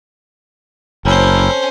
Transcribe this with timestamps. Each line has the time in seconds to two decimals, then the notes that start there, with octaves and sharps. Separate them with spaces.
1.05 F#1 C4 C#4 E4 A4 A#4 C5 G5